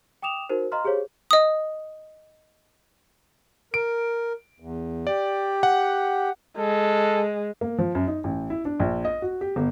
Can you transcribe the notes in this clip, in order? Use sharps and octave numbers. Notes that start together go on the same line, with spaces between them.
G5 D6 D#6 E7 F7
D#4 F#4 A#4 C5
D#5 F5 A#5 C6 F6
G4 G#4 C5 C#5 F5
D#5 D#6
A#4 D7
E2
G4 D5
F#5
G#3 A4
A#3
F3
F#2
D#4
A1
E4
D4
A#1
D#5
F#4
G4
G1